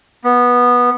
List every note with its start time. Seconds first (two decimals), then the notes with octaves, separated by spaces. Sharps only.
0.24 B3